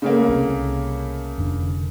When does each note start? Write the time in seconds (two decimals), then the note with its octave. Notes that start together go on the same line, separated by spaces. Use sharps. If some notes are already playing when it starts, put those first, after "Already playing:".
0.02 C#3 A3 A#3
0.28 C2 C3
1.38 F1 D3